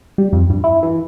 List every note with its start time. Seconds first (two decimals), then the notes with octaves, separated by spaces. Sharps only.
0.18 G3
0.33 F2
0.50 G2
0.64 E4
0.83 E3